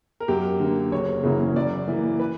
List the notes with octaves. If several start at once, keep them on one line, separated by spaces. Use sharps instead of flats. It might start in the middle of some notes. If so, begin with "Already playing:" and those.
A#4
F#2 G4
D3 A#3
F#1 C#5
F#2 C#3 E3 A#3
F#2 D5
E3 A#3
B4